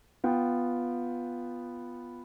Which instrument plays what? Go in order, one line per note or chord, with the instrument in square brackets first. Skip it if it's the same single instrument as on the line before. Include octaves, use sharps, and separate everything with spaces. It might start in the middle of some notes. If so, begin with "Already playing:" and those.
[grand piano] B3 F4 G5